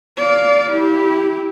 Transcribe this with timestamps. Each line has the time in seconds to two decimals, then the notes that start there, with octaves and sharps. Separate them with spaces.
0.17 D5 F5
0.72 E4 G4